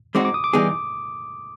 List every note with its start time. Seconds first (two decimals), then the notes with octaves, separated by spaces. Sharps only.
0.15 G#3 C4 D#4 F#4 D6
0.25 D6
0.34 D#6
0.44 D6
0.53 E3 G3 B3 D#4 G#4